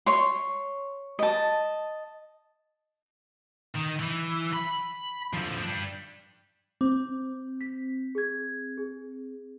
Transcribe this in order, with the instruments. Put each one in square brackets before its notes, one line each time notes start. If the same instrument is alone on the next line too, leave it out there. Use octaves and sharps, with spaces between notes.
[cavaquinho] C#5 C6
D#5 A5
[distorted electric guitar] D#3
E3
B5
D3 F3
G3 D4
[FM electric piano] C4 [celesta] D6
[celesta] B6
G#4 G#6
G#4